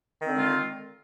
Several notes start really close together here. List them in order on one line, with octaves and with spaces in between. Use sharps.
D#3 C4 D3 G#3 F4